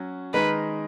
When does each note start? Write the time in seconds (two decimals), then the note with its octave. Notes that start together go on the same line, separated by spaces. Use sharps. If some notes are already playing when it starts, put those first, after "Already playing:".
Already playing: F#3 C#4 F#4
0.34 D#3 G#3 D#4 A#4 B4